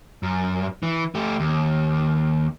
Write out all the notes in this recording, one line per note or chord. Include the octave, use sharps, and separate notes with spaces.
F#2
E3
A3 G4
D#2